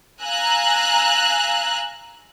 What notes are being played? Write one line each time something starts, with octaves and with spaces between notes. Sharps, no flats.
F5 G#5 A#5 E6 F#6